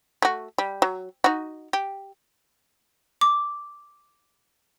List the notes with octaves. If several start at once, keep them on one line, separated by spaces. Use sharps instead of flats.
A3 F#4
G3
F#3
D#4 F#4
G4
D6